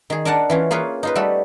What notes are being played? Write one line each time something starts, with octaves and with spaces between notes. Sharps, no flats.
D#3 G#4
D4 A#4 D5 F#5 A5
E3 C#4 F4
A#3 F4 G#4 B4 C#5
D#4 F4 B4
G3 A3 F#4 A4 B5